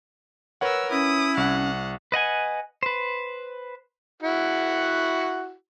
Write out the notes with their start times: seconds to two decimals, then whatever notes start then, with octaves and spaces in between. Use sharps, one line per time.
0.61 A#4 B4 C#5 F#5 E6
0.91 C#4 E4 D#6
1.37 C2 F#5
2.12 B4 D#5 F#5 G#5
2.83 B4 C5
4.23 E4 F#4 F#5